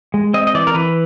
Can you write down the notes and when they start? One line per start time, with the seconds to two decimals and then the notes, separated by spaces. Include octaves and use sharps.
0.14 G#3
0.34 C4 D#5
0.47 D#5
0.54 E3 D5
0.67 A#4
0.74 E3 B4